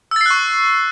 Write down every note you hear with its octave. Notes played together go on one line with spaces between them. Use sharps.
C#6 E6 F#6 A6 C7